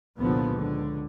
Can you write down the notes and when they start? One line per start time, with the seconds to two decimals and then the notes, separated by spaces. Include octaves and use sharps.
0.19 F1 C2 A#2 D3 F3 B3
0.52 C#2 D3